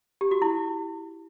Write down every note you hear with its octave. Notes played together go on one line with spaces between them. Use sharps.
G4
F#4
E4